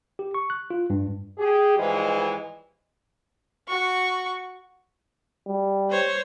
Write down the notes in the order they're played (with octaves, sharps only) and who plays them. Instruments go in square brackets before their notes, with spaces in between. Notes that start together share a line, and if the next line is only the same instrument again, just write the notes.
[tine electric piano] G4
C#6
F#6
F4
G2
[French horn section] G4 G#4
G#2 E3 F3 G3 G#3
[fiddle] F#4 C#6
[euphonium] G3
[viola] C5 C#5